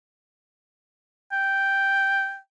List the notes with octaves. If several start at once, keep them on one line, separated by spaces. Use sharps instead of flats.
G5